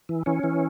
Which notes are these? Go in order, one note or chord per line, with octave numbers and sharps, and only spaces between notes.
E3
E3 C#4
E3